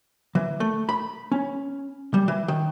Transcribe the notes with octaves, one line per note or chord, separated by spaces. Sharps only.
E3
A3
B5
C#4
G3
E3
D#3